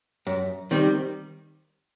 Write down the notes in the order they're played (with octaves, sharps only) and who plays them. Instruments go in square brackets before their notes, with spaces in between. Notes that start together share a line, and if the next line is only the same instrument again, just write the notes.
[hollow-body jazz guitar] F#2
D#3 G3 C4